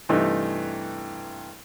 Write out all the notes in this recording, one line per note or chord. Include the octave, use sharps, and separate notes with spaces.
G2 C3 E3 A3 D#4